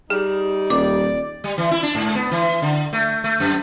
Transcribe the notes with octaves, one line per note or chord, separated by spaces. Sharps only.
G3 D#4 G#4
D#1 D5 D6
G3
E3
E4
D4
G#2
B3
E3
D3
A3
A3
F#2